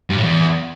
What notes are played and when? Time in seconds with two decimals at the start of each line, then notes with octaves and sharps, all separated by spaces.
0.10 G2
0.17 A2
0.23 E2